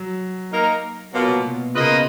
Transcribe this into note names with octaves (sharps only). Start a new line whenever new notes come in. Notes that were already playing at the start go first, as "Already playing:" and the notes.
Already playing: F#3
A#3 D#4 A#4
B2 F#3 A#3 F4
A#2
B2
C#3 A#3 F4 B4 D#5
B2